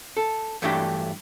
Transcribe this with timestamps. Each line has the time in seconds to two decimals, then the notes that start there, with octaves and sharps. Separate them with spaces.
0.17 A4
0.62 G2 E3 F#3 A3 D4 G4